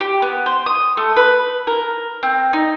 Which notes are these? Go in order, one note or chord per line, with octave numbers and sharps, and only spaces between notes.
G4
B3
C5
D#6
A3
B4
A#4
C4
D#4